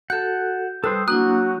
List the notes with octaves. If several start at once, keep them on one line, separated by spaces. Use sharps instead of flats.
F#4 A4 F#5 A5 G6
G3 A4 B4 C5 D#6 E6
F#3 A#3 D4 E4 F#4 D#6 F#6